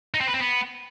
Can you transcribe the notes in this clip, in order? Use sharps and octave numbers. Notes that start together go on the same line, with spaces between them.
D#4
C4
B4
C4
B3